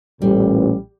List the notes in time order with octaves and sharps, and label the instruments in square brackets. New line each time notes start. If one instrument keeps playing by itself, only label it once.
[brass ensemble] A1 A#2 [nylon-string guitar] G3